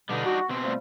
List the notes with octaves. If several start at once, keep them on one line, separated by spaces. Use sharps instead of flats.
B2 D3 G3 D4 D#4
F#4
B2 C4
F3 G3 A3